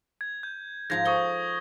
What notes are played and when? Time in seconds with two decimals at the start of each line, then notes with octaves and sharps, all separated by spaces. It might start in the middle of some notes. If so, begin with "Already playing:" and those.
0.21 G#6
0.43 G6
0.90 G#2 F3 A#5 G#6 A#6
1.05 A4 C#6 D#6 G7